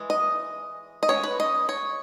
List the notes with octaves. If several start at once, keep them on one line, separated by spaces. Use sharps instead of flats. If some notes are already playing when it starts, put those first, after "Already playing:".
Already playing: E3 G#3
D#5
D#5
G#3 C#4 C#5
B4
D#5
C#5